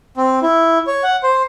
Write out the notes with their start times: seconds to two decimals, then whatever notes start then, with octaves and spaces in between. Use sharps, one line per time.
0.17 C4
0.42 E4
0.87 C#5
1.03 F#5
1.23 C5